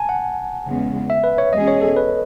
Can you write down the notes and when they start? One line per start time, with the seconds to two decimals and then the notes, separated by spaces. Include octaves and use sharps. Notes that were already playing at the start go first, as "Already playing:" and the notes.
Already playing: G#5 A5
0.09 F#5
0.67 E2 C#3 G#3 B3
1.10 E5
1.24 B4
1.38 C#5
1.53 E2 B2 G#3 C#4 G#4 D#5
1.68 C#5
1.81 A4
1.97 B4